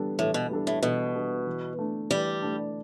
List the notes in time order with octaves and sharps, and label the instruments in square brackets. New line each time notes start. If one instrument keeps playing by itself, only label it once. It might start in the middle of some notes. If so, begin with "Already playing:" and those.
Already playing: [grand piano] E3 G3 B3 D4 A4
[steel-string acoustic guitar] A2 [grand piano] E3
[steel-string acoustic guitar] B2
[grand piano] G3 B3 D4 A4
[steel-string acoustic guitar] A2
[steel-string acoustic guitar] B2 [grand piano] E3
[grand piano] G3 B3 D4 A4
E3
A3 D4
[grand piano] E3 [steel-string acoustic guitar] G3
[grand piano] A3 D4